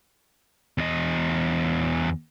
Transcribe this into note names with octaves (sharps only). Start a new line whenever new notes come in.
E2 D#5